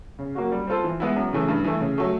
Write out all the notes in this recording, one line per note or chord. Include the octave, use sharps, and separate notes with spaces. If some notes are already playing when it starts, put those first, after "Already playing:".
C#3
F#3 A#3 C#4 F#4
G3
C4 F4 A4 C5
E3
G#3 B3 E4
F#2
C#3 E3 A3
G2
E3 A3
C#3
F#3 A3